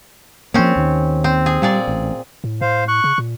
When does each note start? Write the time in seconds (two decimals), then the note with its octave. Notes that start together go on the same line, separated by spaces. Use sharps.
0.54 F3 A#3 C4 C#4
0.76 D#2 D#3
1.24 C4
1.46 G#4
1.62 A#2 G3 G#4 D5
1.88 A1
2.44 A2
2.61 A2 C5 F5
2.88 C#6 F#6
3.04 C#3
3.18 A#2